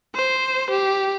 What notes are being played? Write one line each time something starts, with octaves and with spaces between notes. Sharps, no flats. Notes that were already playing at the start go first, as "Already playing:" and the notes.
C5
G4